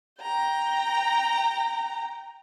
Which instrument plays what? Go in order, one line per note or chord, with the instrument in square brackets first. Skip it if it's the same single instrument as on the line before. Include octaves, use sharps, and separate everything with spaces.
[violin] G5 A#5